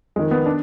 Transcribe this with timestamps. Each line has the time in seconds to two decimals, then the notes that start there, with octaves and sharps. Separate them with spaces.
0.16 F2 G#3
0.19 D#3
0.31 B3
0.46 D4